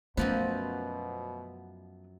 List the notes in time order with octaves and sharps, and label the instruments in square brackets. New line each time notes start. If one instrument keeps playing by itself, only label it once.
[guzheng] F#2 F3 B4 [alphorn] B2 [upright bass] A3 B3 [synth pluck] C5